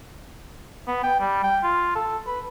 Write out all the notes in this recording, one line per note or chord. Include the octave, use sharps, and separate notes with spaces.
B3
G5
G3
G5
F4
A4
B4